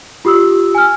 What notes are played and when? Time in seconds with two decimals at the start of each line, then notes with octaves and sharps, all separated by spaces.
0.25 F4 G4 D#6 E6
0.75 G#5 F6